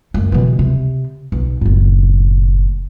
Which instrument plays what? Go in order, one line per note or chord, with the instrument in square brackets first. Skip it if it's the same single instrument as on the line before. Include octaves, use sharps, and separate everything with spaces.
[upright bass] F#2 A3
B2 E3
C3
B1
F#1 A2